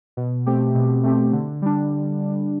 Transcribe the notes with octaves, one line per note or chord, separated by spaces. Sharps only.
B2
A3 C4 G4
B2
A3 C4 G4
D3
G3 D4